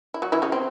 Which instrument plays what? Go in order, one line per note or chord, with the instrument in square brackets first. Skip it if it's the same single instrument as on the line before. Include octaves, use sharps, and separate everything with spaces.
[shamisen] E4
F#3 F#4
E3 E4
C#3 C#4
C4